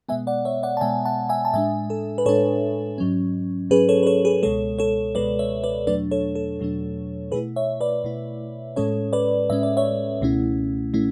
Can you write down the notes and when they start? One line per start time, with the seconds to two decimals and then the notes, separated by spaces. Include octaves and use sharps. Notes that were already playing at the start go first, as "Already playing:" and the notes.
0.09 B2 G#3 B3 E5 G#5
0.27 D5 F#5
0.45 C#5 E5
0.63 D5 F#5
0.77 A5
0.81 B2 G#3 B3 E5 G#5
1.05 F#5 A5
1.29 E5 G#5
1.45 A5
1.54 A2 G#3 D4 E5 G#5
1.90 A4
2.18 B4
2.26 A2 G#3 D4 A4 C#5
2.98 G#2 F#3 C#4
3.70 G#2 F#3 C#4 G#4 B4
3.89 A4 C#5
4.03 B4
4.07 A4 C#5
4.25 G#4 B4
4.43 C#2 B2 G#3 A4 C#5
4.79 A4 C#5
5.15 C#2 B2 G#3 B4 D5
5.39 C#5 E5
5.64 B4 D5
5.87 E2 B2 F#3 A3 D4 B4 D5
6.11 A4 C#5
6.35 A4
6.59 E2 B2 F#3 A3 D4
7.32 B2 A3 E4 G#4 B4
7.56 C#5 E5
7.81 B4 D5
8.04 B2 A3 E4
8.76 A2 G#3 C#4 A4 C#5
9.13 B4 D5
9.50 A2 G#3 C#4 E5
9.63 D5
9.77 C#5 E5
10.21 C#2 B2 A3 C#4 E4
10.94 B2 A3 C#4 E4